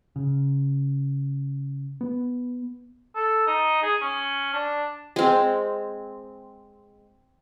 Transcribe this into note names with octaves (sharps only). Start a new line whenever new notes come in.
C#3
B3
A4
D#4
G#4
C#4
D4
G#3 C4